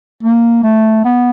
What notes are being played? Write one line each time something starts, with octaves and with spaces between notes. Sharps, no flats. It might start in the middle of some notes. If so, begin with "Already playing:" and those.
A#3
A3
B3